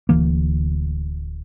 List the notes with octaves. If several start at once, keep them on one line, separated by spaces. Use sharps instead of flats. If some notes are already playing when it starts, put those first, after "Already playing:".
D1 D2 E3 A#3